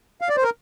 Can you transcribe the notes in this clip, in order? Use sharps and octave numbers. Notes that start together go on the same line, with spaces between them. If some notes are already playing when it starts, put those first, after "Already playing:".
F5
D5
C5
A#4